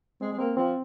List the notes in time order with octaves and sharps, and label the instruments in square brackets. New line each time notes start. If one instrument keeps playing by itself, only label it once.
[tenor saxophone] G#3 [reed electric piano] C4
[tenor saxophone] G#3
[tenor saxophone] A#3 [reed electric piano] C4
[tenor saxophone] F3 [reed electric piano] C4